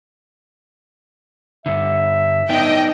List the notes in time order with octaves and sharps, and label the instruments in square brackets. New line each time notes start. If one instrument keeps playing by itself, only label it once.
[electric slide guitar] G2 D3 [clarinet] E5
[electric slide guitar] B3 D4 D#4 [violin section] D#5 G5